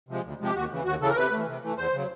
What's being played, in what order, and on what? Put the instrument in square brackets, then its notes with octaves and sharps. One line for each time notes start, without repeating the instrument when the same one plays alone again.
[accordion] C3 F3 G#3
D2
C3 F3 G#3 G4
D#2 F#4
C#3 E3
D#2 F#4
C#3 E3 A4
A#4
C3 B4
A3
E3
C3
E3 A3
E2 C5
C#3 F#3